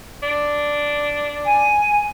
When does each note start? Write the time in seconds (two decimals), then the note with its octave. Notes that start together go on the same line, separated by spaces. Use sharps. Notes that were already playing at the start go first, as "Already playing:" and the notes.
0.23 D4
1.46 G#5